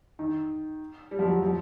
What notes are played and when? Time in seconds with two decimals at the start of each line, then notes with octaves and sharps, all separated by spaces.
0.19 D#3
1.11 G3
1.19 F3
1.26 F#3
1.42 F3